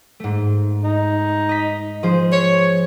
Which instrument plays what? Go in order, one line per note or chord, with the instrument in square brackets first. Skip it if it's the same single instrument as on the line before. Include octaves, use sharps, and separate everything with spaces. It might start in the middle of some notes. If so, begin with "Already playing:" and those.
[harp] G#2 A3
[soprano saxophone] D#4
[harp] D#5 B6
F3 G#4 C5
[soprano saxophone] C#5